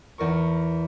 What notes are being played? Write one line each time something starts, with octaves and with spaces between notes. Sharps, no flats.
E2 A#4 C#6